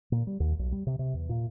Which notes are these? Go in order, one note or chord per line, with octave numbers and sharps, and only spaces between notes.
A#2
G3
D#2
B1
G3
C3
C3
E2
A#2